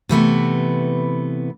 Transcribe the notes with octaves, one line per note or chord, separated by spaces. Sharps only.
C3 E3 A3 B3